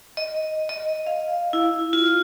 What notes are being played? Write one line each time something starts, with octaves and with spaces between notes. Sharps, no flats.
D#5
D#5
F5
E4
F4